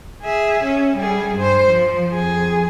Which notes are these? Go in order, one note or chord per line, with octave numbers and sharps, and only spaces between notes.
G#4 E5
C#4
G3 G#4
G2 C5
F3
F2 G#4